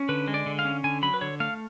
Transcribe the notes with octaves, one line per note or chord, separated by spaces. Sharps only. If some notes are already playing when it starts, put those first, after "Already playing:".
Already playing: C#4
D3 B4
G#3
D5
D3
F5
C#4
D3 G#5
F#3 B5
B4
D3 C#5
A3 F5